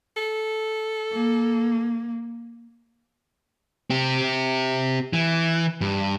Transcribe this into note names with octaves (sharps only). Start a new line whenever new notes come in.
A4
A#3
C4 G4
E3
G2